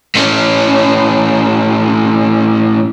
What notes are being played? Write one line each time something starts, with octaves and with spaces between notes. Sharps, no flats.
A2 C#4